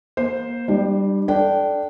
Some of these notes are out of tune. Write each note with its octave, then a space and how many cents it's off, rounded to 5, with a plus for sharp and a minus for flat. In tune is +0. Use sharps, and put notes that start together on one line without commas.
A#3 +30 C5 +0
G3 +0 D4 +40
D4 +0 A4 +0 G5 -20